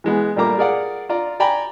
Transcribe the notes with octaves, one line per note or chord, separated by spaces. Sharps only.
E3 G#3 B3
A#2 G3 A3 A#3 A#5 D6
G#4 A#4 D5 F5 F#5
F4 D5 A#5
D5 G5 G#5 A#5 B5